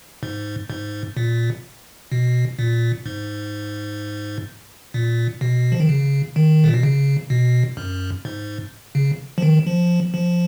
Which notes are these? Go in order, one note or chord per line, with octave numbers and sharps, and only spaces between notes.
G#2
G#2
A#2
B2
A#2
G#2
A#2
B2
F3
D#3
C#3
D#3
A#2
B2
C#3
B2
F#2
G#2
C#3
F3
D#3
F3
F3